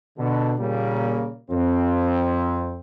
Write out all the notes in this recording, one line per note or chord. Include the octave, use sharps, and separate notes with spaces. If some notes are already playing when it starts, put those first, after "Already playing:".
B2 D3
A#2 C#3 G3 A#3
F2 C4